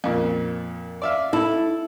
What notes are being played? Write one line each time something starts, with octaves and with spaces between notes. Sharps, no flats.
F2 A#2
D5 E5 F5
E4 A4